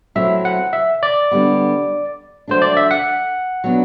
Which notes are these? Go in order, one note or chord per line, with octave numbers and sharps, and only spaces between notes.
F#3 A3 C4 E4 E5
F#5
E5
D5
D3 G3 B3
F#3 A3 D4 C5
D5
E5
F#5
F#3 B3 D4